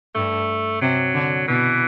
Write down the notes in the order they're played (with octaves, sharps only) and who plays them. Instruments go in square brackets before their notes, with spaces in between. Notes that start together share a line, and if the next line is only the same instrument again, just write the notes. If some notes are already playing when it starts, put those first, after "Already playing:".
[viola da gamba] G2 [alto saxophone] A3
[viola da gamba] C3 [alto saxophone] F#3
[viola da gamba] D3
[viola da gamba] B2 [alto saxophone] E3